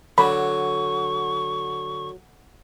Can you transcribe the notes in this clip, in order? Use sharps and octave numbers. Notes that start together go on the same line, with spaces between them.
D3 F#3 B5 C#6